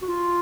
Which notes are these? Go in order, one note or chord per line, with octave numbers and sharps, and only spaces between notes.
F#4
F4